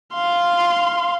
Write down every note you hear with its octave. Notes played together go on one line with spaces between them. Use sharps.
F5 C6